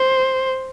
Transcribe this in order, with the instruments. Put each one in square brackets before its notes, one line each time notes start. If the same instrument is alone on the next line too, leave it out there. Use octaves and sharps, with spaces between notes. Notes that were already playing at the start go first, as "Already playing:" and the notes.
Already playing: [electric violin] C5